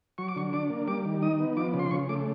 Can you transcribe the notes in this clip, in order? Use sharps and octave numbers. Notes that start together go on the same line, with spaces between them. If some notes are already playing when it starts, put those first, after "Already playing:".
F#3 C#6
D6
D3 C#6
D4 D6
A#3
G3 D6
D#3
D#4 D#6
B3
F3 D6
C#3
C6
C#3 C#6
A3 D6